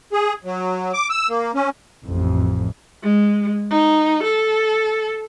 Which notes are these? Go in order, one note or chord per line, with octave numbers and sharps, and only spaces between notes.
G#4
F#3
D6
E6
A#3
C#4
A1 F2
G#3
D#4
A4